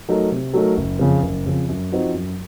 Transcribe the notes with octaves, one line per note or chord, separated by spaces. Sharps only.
F#3 A3 D#4 A#4
C3
F#3 A3 D#4 A#4
F#1
F2 C#3 F3
F#1
F2 C#3 F3
F#2
F3 C4 D#4 F#4
F#2